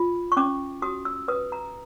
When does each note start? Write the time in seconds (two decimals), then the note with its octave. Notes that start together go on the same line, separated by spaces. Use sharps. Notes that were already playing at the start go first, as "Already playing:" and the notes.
Already playing: F4
0.32 C#6
0.37 C#4 D6
0.82 F#4 D#6
1.05 E6
1.28 B4 D#6
1.52 A#5